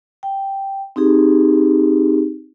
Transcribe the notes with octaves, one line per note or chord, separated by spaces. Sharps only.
G5
C4 D#4 G4 G#4